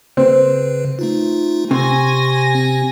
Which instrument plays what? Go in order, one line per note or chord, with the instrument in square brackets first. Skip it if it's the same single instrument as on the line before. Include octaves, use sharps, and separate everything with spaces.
[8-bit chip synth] C#3 B4 [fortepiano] C4
[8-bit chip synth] A3 D#4 F4
[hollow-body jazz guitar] C3 [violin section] G#5 A#6 [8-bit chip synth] C6 C#6
[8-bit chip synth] C4